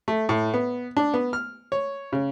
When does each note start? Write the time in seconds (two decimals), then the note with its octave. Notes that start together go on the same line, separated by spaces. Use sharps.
0.08 A3
0.29 A2
0.54 B3
0.97 D4
1.14 B3
1.33 F6
1.72 C#5
2.13 C#3